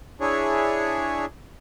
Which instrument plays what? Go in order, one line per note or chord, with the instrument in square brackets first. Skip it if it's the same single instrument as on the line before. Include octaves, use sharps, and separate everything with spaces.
[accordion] D4 E4 G#4 C#5